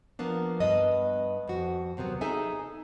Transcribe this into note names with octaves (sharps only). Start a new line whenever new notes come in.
F3 A#3 B3 D4
G2 B3 B4 D#5
F2 F#4
D#2 C3 F#3 B3
D#4 G#4 A4 E5 G#5